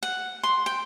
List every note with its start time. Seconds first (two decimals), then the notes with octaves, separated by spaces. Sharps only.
0.03 F#5
0.43 C6
0.66 G5